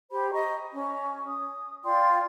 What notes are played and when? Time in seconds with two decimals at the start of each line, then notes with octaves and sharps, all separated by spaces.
0.11 G4 C5 B5
0.31 D#5 A#5 C#6
0.72 C#4
1.27 D#6
1.84 F4 D5 G5 C6